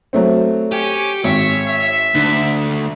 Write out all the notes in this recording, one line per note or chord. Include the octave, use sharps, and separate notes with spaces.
F#3 A3 C4
C#4 G4
G#1 C#5 E5
E5
D2 D4